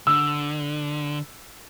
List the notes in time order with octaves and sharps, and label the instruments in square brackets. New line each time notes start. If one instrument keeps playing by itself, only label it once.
[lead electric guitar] D3 [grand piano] E6